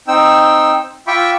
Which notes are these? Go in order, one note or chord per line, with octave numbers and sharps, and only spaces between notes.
C4 D#4 G5 E6
F4 E5 G5 B5 C#6 D6